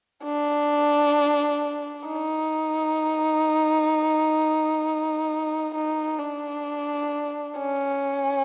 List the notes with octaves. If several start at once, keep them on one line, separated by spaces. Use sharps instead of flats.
D4
D#4
D#4
D4
C#4